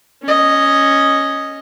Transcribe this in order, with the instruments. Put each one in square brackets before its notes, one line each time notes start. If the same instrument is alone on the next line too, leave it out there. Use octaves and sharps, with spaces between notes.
[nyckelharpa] C#4 D#5